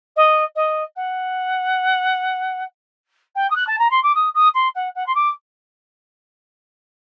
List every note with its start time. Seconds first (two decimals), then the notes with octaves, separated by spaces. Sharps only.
0.16 D#5
0.55 D#5
0.96 F#5
3.35 G5
3.50 D#6
3.55 F#6
3.67 A5
3.78 A#5
3.90 C6
4.03 D6
4.15 D#6
4.34 D#6
4.54 C6
4.75 F#5
4.95 F#5
5.06 C6
5.15 D6